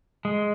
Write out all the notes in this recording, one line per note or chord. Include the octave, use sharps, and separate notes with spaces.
G#3